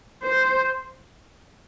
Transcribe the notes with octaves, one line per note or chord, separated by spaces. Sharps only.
C5